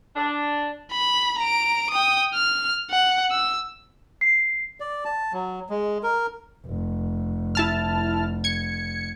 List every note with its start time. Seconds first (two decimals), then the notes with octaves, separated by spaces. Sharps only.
0.16 D4
0.92 B5
1.39 A#5 D7
1.91 G5 D#6
2.35 F6
2.91 F#5
3.31 E6
4.21 C7
4.80 D5
5.05 A5
5.33 F#3
5.69 G#3
6.03 A#4
6.66 F1
7.55 E4 A5 F6
8.44 G#6 C#7